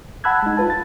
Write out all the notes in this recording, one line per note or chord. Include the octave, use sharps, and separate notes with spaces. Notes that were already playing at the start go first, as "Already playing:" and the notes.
F#5 A5 B5 E6 F#6 G#6
G#3 D#4
F4 B4 A5
A6